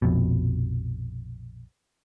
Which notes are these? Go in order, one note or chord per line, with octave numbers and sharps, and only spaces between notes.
A#1 F2 B2